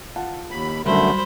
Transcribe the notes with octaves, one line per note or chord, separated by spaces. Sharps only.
F4 F#5 A5
D#2 B5
C2 F#2 D3 F#3 G3 A3 C5 B5